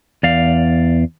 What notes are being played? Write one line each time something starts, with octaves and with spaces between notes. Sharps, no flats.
E2 D5 F5